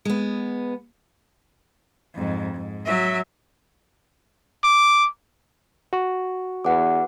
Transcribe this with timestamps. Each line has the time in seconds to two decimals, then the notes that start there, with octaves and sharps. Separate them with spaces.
0.05 G#3 B3
2.15 F2 G#2
2.54 G#2
2.85 F#3 E5
4.64 D6
5.93 F#4 C#6
6.65 E2 B4 F#5 D6